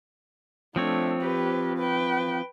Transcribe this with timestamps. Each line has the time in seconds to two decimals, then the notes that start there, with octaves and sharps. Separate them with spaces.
0.76 F3 A3 C4 D4 C#5
1.22 G4 B4
1.79 B4 G5